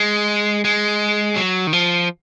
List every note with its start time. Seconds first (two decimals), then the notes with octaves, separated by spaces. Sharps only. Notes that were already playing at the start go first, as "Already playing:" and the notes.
Already playing: G#3
0.65 G#3
1.36 F#3
1.67 D#3
1.73 F3